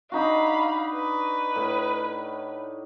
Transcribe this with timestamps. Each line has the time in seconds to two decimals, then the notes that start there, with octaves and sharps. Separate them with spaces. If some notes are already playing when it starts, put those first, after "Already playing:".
0.12 D4 D#4 F#4 F5 B5
0.93 B4
1.56 A2